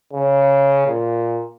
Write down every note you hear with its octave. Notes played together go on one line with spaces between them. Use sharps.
C#3
A#2